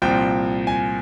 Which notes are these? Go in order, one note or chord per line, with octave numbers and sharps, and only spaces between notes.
C2 A#2 F3 G5
G#5